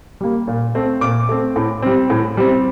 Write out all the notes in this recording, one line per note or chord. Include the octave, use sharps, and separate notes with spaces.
G3 A#3
A#2
A3 C4
A#2 D6
A3 C4
A2
G3 C4
A2
G3 C4